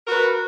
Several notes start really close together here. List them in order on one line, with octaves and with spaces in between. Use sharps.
A#4 F#4 B4